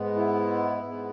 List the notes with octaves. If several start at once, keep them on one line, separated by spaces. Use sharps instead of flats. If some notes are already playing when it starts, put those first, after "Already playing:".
Already playing: G#2 G#3 B3
E4
G#2 G#3 B3